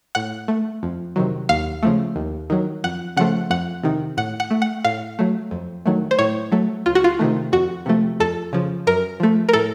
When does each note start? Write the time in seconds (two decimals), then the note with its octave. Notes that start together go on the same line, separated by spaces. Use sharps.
0.15 A2 F#5
0.48 A3
0.83 F2
1.16 C3 D#3 F#3
1.49 D#2 F5
1.83 C#3 F3 A3
2.16 D#2
2.50 D#3 F#3
2.84 F2 F#5
3.17 C#3 F3 A3 F#5
3.50 F2 F#5
3.83 C3 D#3
4.17 A2 F#5
4.40 F#5
4.50 A3
4.62 F#5
4.85 A2 F5
5.19 F#3 A3
5.51 F2
5.86 D#3 F#3 A3
6.11 C5
6.19 A2 C#5
6.52 F#3 A3
6.86 C#2 F4
6.95 F#4
7.04 F4
7.19 C3 D#3 A3
7.52 F2 F#4
7.86 C3 F3 A3
8.20 F2 A4
8.53 C#3 F3
8.87 F#2 A#4
9.20 F3 A3
9.49 A#4
9.53 A2 A4